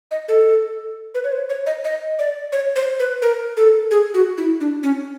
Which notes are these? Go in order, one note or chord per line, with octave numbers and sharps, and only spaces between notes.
D#5
A4
B4
C#5
C5
C#5
D#5
D#5
D5
C#5
C5
B4
A#4
A4
G#4
F#4
E4
D4
C#4